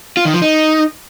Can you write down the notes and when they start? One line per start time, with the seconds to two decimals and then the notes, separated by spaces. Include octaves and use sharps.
0.17 F4
0.25 D#3
0.34 F3
0.42 D#4